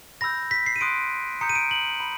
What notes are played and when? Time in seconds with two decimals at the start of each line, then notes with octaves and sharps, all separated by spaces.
0.21 B5 E6 G6 A#6
0.51 B6
0.66 C7
0.76 D#7
0.81 C6 D#6 F#6 D7
1.41 A#5 D#6 G6 C#7
1.49 D#7
1.55 D7
1.71 F#7
2.00 B5